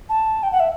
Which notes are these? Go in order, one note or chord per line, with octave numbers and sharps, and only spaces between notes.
A5
G5
F#5
E5